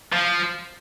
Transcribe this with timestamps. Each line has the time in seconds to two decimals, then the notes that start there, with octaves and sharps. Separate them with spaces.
0.12 F3